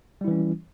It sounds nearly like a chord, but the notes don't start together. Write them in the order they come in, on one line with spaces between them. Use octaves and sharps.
G3 E4 E3 C#4